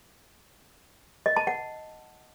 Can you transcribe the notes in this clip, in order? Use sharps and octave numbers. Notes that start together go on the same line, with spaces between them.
D#5
A5
F#5